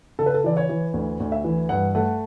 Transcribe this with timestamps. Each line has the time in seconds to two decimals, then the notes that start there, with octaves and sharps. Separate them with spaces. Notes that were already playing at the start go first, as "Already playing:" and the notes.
0.19 C#3 A4
0.26 B4
0.34 A4
0.44 E3 D5
0.57 C#5
0.69 E3
0.94 D2
1.20 D2
1.32 E5
1.44 E3
1.69 G2 F#5
1.95 A3 F#5